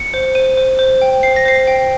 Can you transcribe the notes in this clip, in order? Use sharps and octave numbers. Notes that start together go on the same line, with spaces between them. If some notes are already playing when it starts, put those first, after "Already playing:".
Already playing: C#7
C5
C5 D#7
C5
C5
G5
C5 C7
A#6
C5 C7
G5